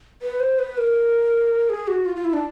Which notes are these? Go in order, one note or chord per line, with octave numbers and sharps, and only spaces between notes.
B4
C5
B4
A#4
G#4
F#4
F4
F4
E4
D4